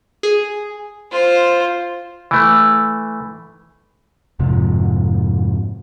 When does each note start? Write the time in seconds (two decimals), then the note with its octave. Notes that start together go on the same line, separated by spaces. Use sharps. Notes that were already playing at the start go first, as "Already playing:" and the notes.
0.23 G#4
1.12 F4 C5
2.31 E3 A3
4.39 F2 G#2 C3 F3